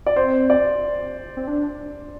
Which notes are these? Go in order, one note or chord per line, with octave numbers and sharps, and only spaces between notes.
D5
C4 C5
D5
C4
D4